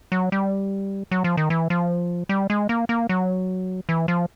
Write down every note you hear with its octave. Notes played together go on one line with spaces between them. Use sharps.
F#3
G3
F#3
F3
D#3
E3
F3
G3
G#3
A#3
A#3
F#3
E3
F3